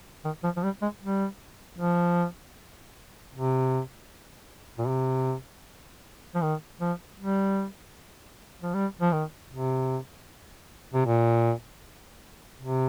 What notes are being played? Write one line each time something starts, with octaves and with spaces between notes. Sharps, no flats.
D#3
F3
F3
G3
G#3
G3
F3
C3
A#2
C3
F3
D#3
F3
G3
F3
G3
F3
D#3
C3
C3
A#2
C3